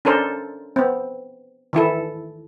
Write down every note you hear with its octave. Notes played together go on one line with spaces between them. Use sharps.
C#4 D4 A4 A#4 C5
B3 C4
D#3 E3 E4 A4